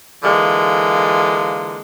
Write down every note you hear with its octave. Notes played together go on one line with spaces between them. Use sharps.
D3 E3 G#3 A#3 F4